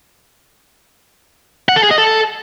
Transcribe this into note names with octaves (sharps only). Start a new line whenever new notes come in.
F#5
A4
G#4
D#5
A4